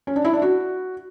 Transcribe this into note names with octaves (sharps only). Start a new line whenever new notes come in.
C#4
D4
E4
D4
F#4